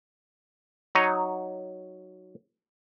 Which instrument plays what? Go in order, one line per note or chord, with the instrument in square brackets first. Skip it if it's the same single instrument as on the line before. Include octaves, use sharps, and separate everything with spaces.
[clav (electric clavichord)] F#3 D#4 C#5 D#5